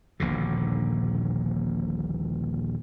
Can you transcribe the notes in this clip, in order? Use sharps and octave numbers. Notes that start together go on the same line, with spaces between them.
D#1 A#1 B2 D3